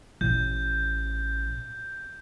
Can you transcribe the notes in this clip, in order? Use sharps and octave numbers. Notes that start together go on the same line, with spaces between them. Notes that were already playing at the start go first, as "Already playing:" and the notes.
A1 G6